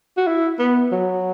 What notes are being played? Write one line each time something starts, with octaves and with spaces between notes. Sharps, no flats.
F#4
E4
B3
F#3